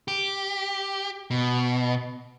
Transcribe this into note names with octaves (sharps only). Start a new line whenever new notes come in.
G4
B2